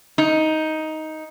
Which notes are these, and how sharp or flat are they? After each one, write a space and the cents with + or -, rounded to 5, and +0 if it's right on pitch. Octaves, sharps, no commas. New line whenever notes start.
D#4 +10